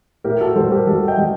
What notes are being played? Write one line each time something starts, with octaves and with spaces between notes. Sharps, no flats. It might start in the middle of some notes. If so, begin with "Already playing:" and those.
A2 G4 A#4
F#4 A4
G3 A4 C5
G4 A#4
G3 F#4 A4
D#5 G5
G3